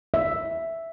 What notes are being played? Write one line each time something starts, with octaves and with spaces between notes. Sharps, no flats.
E5